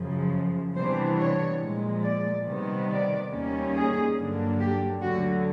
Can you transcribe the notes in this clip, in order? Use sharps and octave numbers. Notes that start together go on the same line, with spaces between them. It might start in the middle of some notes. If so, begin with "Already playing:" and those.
Already playing: F#2 C#3 F3
C3 E3 G3 B3 D4 C5
C#5
A#2 F3 G#3
D5
C3 D#3 G3 B3
D5
D#2 D#3 G3 A#3 C#4
G#4
G2 D3 F#3 A#3 D4
G4
D2 D3 F#3 F#4